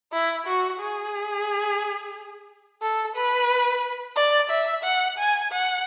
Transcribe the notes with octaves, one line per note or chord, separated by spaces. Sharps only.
E4
F#4
G#4
A4
B4
D5
E5
F#5
G#5
F#5